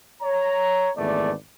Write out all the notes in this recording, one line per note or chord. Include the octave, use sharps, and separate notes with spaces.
C#5 A#5
G#1 E2 A3 D5